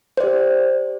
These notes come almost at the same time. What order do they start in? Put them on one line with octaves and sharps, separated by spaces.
C5 D5 G4